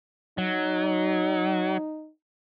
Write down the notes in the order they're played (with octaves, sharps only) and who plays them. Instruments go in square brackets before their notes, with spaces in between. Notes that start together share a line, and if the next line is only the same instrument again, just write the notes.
[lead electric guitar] F#3 [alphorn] D#4